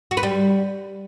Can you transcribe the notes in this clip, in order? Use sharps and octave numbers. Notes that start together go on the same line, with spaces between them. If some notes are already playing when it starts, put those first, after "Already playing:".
F#4
B4
G3